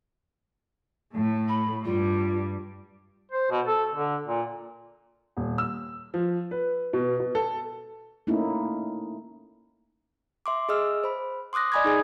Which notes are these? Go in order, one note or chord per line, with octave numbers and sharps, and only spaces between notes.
A2 A3
B5
G2 G3 F4
C5
B2
A4
D3
A#2
D#1
E6
F3
B4
B2
B2
A4
A3 A#3 C#4 D#4 E4
E5 C6 D6
G#4 D#5 E6 F6
C5 B5
C6 D6 D#6 F#6 A#6
D5 D#5 G#5 B5 D#6 G#6
D#4 G#4 G#5